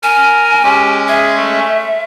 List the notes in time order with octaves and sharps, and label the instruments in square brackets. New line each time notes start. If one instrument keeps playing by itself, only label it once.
[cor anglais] A#4 [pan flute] G#5
[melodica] G#3 C#4 [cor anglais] G4
[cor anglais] G#4 [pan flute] E5
[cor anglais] A3